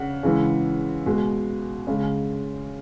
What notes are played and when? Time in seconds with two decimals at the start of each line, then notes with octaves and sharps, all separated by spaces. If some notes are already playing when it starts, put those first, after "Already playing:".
Already playing: C#3 F#5
0.23 C#3 E3 G#3
1.06 B2 G#3
1.87 C#3 G#3